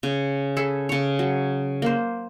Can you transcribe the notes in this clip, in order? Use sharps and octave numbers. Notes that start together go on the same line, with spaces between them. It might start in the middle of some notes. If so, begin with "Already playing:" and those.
C#3
G#4 A4 B5
C#3 C#5
F#3
A#3 C5